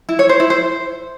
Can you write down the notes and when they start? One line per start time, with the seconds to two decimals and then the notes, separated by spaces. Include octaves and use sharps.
0.09 E4
0.19 C#5
0.29 C5
0.40 E4
0.50 C5